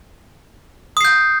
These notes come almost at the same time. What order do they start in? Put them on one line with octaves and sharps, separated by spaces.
D#6 C7 G6